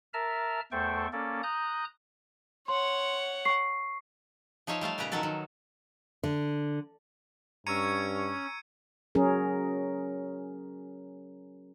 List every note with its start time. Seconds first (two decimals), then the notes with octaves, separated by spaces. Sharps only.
0.14 A#4 E5 A5 A#5 F6
0.72 E2 A3 A4 C5 G5 C#6
1.13 A#3 C#4 A4 D5
1.43 A#5 D#6 F#6 G6
2.68 C#5 F#5 C6
3.45 C#6 C7
4.67 F3 D#4 C#5 E5 F5
4.81 G3 A3 F5 A5
4.98 A#2 C#3 G4 B4 A#5
5.12 D#3 F3 F#3 F#4 A4 A5
5.23 D#3
6.23 D3
7.67 G2 C#4 A#5 C#6 E6 G#6 C#7 D#7
9.15 F#3 C#4 G#4 A#4